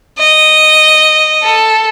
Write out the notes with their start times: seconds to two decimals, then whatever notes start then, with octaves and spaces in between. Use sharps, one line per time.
0.19 D#5
1.43 A4